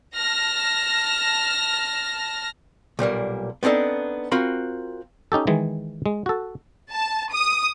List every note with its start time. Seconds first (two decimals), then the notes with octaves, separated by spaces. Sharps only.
0.14 A5 F6 A#6
2.99 B1 A#2 G3 A#3
3.63 B3 C4 D4 D#4 A4
4.32 C4 F4 F#4 A#4 B5
5.32 C#4 D#4 G4 A4
5.47 D#3 E3 G#3
6.06 G#3
6.26 F#4 A4
6.92 A5
7.33 D#6